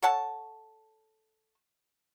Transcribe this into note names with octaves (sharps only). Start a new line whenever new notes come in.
A4 C#5 F#5 A5